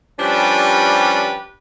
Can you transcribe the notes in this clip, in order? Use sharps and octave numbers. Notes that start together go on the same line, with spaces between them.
F3 G3 C#4 D4 G4 B4